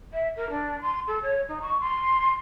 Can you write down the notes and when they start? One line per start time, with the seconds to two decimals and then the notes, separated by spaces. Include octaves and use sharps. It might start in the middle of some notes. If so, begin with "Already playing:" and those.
0.13 E5
0.36 A#4
0.50 D4
0.81 C6
1.07 A4
1.22 C#5
1.48 D#4
1.62 C#6
1.80 C6